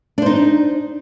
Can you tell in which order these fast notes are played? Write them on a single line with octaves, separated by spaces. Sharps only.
D4 C5 D#4